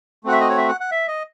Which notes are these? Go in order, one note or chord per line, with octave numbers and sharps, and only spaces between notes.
A3 C4 F#4 F#5
E5
D#5
C#5
E5
F#5
F#5
E5
D#5